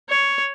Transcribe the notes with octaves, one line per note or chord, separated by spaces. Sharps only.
C#5